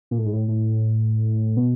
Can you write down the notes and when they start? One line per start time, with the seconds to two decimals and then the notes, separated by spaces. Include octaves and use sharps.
0.11 A#2
0.18 A2
0.26 G#2
0.33 A2
0.48 A2
1.57 B2